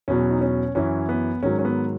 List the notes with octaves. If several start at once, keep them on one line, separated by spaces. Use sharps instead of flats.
E2 B2 F#3 C#4
D#4
C#4
F#2 E3 C#4
B3
G#2 D#3 F#3 C#4
C#4
B3